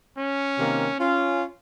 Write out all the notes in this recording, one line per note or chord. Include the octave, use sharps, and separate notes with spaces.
C#4
C3 D#3 A#3
C#4 F4